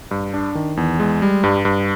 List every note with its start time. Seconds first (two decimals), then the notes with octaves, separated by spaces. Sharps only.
0.11 G2
0.34 D4
0.55 D#3
0.77 E2
1.00 G#3
1.22 G3
1.44 G2
1.65 G2